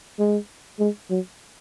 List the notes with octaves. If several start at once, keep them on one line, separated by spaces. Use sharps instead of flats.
G#3
G#3
F#3